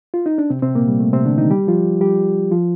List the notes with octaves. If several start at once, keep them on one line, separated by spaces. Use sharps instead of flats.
F4
D#4
D4
C3 C4
C3 C4
A#2 A#3
G3
A3
C3 C4
D3 D4
D#3 D#4
G3 G4
F3 F4
G3 G4
F3 F4